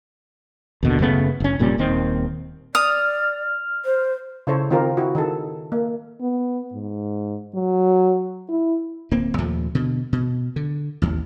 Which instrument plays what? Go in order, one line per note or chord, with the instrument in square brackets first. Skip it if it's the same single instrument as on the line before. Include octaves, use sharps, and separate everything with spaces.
[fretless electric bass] D#2 B2 D3
F#1 C#3 A3 B3
F#1 C#4
F1 A#2 G3 C#4
D#1 D#2 D#3 C4
[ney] D5 [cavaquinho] D#6 [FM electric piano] F6
[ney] C5
[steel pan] C#3 E4 A4 C5 C#5
D#3 C4 F4 G4 A#4
E4 F#4
D#3 G#4 A4
A#3
[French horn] B3
G#2
F#3
E4
[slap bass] D1 A#3 C4
D#2 A#2 F3 A3
B2 D3
B2
D3
A1 D#2